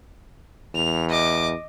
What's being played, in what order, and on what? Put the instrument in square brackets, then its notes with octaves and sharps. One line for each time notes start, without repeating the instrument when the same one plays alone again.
[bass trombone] E2 [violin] F7
[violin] D#5 D6